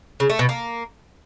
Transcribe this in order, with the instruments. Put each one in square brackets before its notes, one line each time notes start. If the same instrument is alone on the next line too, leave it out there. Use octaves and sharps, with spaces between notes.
[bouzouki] C#3
A3
B2
A#3